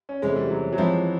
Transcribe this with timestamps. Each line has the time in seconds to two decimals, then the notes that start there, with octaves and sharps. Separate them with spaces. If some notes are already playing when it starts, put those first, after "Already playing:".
0.09 C#4
0.22 E2 C3 E3 G#3 A3 C#4
0.36 G3
0.50 F#3
0.73 F#3
0.78 E3 F3 G#3 C4 E4